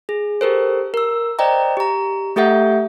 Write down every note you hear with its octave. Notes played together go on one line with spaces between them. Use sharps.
G#4
G4 A4 A#4 C5
A#4 E6
C5 D5 D#5 G5 A#5
G4 A#5
A3 G4 A4 E5 F#5 G6